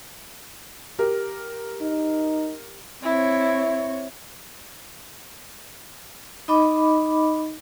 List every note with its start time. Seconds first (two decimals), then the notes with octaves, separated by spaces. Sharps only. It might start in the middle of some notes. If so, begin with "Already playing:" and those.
0.99 G4 A#4
1.82 D#4
3.03 C4 E4 C#5
6.48 D#4 D#5 B5 D6